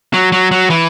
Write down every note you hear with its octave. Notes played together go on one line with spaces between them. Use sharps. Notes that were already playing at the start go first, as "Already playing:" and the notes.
F#3
F#3
F#3
E3